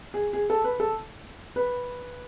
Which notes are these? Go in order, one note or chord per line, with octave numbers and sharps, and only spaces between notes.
G#4
G#4
A4
B4
A4
B4